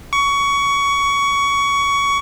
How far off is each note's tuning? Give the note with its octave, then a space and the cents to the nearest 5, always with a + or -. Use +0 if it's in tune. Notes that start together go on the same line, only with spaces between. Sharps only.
C#6 +20